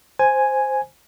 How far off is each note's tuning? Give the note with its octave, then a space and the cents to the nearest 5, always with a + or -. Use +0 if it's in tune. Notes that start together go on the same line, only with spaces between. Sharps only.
C5 +0 G#5 +0